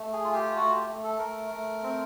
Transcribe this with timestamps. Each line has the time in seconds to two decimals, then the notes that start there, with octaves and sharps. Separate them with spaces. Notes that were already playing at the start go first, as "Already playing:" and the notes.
Already playing: A3
0.13 G#4
0.24 F4
0.34 G4
0.56 A3 F#4
0.72 G4
0.88 A3
1.04 A4
1.19 A3 A#4
1.51 A3
1.83 C4